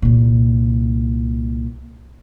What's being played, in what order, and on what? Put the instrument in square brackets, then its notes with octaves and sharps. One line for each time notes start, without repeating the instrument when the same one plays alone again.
[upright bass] C2 A#2